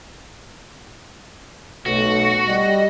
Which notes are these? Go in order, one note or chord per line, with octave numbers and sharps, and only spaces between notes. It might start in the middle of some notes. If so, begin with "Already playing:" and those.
B1 A3 F#4
G3 D#5